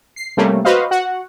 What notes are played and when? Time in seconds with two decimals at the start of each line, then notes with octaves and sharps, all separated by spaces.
0.16 C7
0.37 C3 G3 A3 A#3 C#4
0.65 F#4 B4 C5 D#5 F5
0.91 F#4 F#5